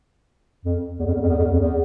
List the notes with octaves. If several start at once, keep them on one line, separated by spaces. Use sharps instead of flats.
F2
E2
F2
E2
F2
E2
F2
E2
F2
E2